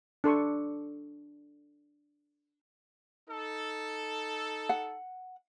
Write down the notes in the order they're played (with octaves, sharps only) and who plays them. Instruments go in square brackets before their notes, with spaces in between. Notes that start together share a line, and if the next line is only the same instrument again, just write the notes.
[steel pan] D4 A4 C6 C#6
[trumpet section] D#4 A4
[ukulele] F#5